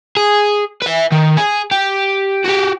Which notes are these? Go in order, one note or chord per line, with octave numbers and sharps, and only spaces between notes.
G#4
B4 E5
D#3
G#4
G4
F#4 G4